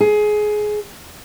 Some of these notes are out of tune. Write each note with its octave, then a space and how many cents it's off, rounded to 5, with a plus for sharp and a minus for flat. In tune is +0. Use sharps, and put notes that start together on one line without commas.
G#4 +20